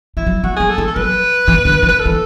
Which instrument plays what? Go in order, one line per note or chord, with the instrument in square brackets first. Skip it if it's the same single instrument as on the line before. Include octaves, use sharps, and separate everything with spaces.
[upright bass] E3 [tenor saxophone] E4
[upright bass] F#3
[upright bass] F#3 [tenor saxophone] F#4
[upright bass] F#3 [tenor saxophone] G#4
[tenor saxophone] A4
[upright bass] E3
[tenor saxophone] A4
[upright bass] F#3 [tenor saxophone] B4
[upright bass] E3
D3
E3
[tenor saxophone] B4
A4
[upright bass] E3